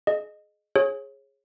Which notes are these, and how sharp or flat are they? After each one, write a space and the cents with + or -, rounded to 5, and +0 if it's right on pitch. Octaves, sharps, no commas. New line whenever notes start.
G#4 +25 D#5 -20
G#4 +0 C#5 -25 D#6 +25